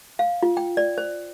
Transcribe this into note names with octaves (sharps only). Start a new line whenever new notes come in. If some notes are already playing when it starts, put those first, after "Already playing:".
F5
F4
G5
D5
C5